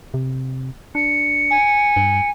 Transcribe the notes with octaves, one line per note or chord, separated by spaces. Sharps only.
C3
D4 C#7
G#5
G2